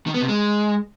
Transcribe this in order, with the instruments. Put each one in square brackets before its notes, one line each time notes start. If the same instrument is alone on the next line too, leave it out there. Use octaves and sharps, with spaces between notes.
[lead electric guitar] D#3
B3
C3
G#3